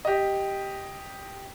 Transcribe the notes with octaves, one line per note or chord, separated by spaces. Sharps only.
G4 D#5